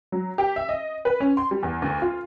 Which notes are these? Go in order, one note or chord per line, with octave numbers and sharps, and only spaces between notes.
F#3
G4
E5
D#5
B4
C#4
C6
G3
E2
D2
F4